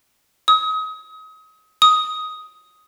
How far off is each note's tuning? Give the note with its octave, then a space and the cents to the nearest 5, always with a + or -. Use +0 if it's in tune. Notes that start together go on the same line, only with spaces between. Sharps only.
D#6 +35
D#6 +10